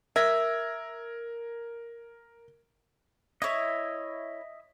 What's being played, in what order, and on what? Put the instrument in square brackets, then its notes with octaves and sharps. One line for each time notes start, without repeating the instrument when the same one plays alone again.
[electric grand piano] A#4 G#6 A#6 [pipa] E5
[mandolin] E4 C#5 [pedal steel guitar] D#5 E5